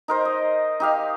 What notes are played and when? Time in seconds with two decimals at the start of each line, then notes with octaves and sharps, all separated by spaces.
0.08 D#4 A#4 C5
0.25 D#5
0.80 D#4 G4 F5